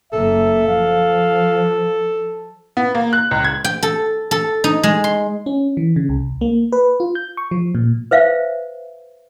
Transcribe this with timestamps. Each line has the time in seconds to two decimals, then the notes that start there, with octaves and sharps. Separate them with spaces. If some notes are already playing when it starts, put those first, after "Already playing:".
0.13 F#1 A#3 A4 E5
0.67 F3 F5
2.77 B3
2.95 A#3
3.13 F#6
3.31 C#2
3.45 G#6
3.65 G5
3.83 A4
4.31 A4
4.64 D#4
4.83 G#3
5.04 C6
5.46 C#4
5.77 E3
5.96 C#3
6.09 C2
6.41 A#3
6.72 B4
7.00 F4
7.15 G6
7.37 C#6
7.51 F3
7.75 A#2
8.11 B4 C5 E5 F5